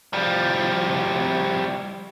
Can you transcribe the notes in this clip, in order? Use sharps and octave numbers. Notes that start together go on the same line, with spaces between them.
F3 G3